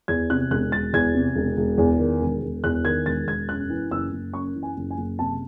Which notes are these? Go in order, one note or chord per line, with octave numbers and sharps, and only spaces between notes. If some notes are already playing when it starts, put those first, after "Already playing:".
E2 G#6
C3 F#6
E1 F#6
E1 A6
E2 G#6
C3
E1
E1
E2
D#3
E1
E1
E2 F#6
D#3 G#6
E1 A6
E1 G#6
F#2 F#6
E3
F#1 E6
F#1
F#2 C#6
E3
G#5
F#1
G#5
F#1
C3 A5